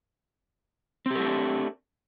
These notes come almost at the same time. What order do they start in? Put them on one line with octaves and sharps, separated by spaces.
C4 G4 A#4 A3 D4